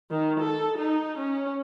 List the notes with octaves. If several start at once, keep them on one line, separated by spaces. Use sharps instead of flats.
D#3
A4
D#4
C#4